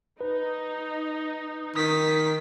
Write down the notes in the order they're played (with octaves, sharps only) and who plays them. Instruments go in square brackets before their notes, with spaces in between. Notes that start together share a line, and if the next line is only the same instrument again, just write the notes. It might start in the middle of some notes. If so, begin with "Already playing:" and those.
[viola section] D#4 [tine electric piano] B4
[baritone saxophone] D#3 [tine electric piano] D#6 [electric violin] B6